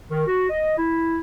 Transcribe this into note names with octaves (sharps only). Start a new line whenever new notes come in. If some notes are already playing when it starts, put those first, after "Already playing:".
D#3
F#4
D#5
E4